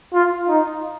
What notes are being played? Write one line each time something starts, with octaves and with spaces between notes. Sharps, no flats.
F4
D#4